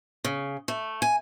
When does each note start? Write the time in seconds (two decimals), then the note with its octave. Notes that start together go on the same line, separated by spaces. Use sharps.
0.25 C#3
0.68 A3
1.02 G#5